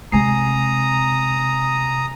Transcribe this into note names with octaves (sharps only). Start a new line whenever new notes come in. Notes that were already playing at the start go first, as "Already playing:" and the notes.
C3 G#3 C4 G#5 A#5 D#6 C7